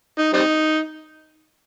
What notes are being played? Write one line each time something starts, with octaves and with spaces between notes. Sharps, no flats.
D#4
G3 C4 D#4